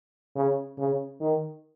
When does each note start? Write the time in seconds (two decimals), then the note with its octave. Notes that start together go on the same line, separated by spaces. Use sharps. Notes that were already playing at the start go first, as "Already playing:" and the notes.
0.36 C#3
0.78 C#3
1.20 D#3